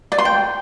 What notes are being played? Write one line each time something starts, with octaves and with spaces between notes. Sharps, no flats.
D5
C6
G5